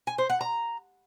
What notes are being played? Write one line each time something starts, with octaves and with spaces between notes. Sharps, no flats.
G#5
C5
F#5
A#5